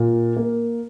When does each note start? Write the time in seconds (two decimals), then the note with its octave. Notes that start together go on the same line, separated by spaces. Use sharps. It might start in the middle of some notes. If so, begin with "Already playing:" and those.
Already playing: A#2
0.37 A#3